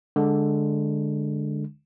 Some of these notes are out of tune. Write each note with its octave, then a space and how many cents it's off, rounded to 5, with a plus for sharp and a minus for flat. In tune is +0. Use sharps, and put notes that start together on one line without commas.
D3 +0 G#3 +0 D4 +0